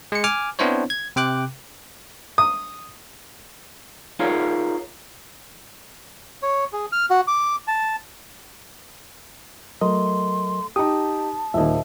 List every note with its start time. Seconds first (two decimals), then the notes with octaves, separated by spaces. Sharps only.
0.12 G#3 C#7
0.24 G#5 D6 F6
0.59 B3 C4 D4 E4 C5 C#5
0.90 G#6
1.16 C3 G5 D6 F#6
2.38 D#6
4.19 D#4 F4 G#4 A#4 C#5 F5
6.42 C#5
6.73 G#4
6.92 F6
7.10 F#4
7.27 D6
7.68 A5
9.81 F#3 A3 A#4 D#5 C6
10.76 D#4 G4 A5 D#6
11.54 D#1 D#2 D#5 E5